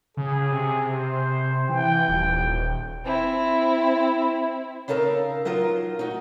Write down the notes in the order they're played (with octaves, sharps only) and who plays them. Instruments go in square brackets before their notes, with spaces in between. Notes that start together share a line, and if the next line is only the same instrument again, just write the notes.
[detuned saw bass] C#3 [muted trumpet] G#4
[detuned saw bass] C3
[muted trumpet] C5
[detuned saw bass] E3 [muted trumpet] G5
[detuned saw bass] D#1
[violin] C4 E4
[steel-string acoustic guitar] C#3 D#4 A4 A#4 F5
F#3 D#4 F4 A#4
D#4 F#4